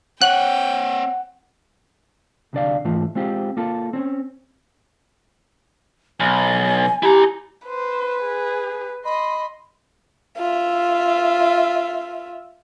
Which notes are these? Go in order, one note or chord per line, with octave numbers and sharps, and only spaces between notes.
C4 C#5 F#5 G5 F#6
C2 D3 D5 F5
G#2 E3 A3 F4
G#3 C4 F4 G4
A#3 F4 A4
C4 C#4
B1 G#5
E4 G4 A#5
B4 C5
G#4
D#5 B5 C6
F4 E5